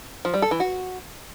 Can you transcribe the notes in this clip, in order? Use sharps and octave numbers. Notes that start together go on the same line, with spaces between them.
F3
G3
A4
E3
F#4